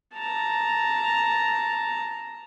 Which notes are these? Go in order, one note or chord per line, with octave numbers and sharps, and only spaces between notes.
A5 A#5